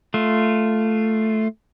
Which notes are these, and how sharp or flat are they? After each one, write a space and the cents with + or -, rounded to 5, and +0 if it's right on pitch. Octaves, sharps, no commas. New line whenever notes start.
A3 +0 F4 +0